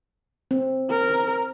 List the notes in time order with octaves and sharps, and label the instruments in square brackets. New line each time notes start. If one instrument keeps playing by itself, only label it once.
[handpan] C4
[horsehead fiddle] A#4